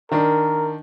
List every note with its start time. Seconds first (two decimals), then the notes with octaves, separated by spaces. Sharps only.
0.11 D#3 D4 A#4